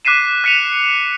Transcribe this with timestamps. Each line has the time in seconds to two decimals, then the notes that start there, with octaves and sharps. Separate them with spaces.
0.05 D6 F#6 B6 C7 D#7 E7
0.44 F#6 B6 C#7 D#7 F7